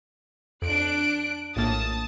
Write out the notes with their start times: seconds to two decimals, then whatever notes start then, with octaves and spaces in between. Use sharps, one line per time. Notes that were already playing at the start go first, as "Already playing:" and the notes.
0.62 F2 D4 F#6 D7
1.56 A#1 A2 A#3 A5 D#6 A6